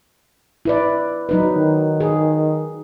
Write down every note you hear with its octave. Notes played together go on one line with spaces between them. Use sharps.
E4 B4 D5
F#3 D#4 B4
D#3
G#4